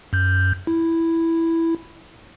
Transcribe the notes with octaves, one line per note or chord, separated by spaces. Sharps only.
F#2 G6
E4